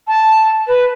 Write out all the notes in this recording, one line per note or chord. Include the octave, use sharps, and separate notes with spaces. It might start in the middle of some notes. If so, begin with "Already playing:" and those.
A5
B4